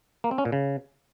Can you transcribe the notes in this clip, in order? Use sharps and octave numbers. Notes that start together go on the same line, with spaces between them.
A#3
C4
C#4
A#2
C#3